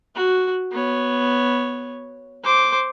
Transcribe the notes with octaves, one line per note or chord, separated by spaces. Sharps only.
F#4
B3 C#5
C5 D6